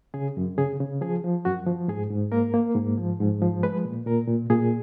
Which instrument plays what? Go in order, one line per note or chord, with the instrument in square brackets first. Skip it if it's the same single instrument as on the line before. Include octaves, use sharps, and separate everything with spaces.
[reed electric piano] C#3 G#4
F#2
C#3 G#4
C#3
F3 G#4
F3
F#2 F#4
F3
G#2 G#4
G#2
A#3 A#4
A#3
G#2
F3
G#2
F3
G#3 B4
A#2
A#2 A#4
A#2
A#2 G#4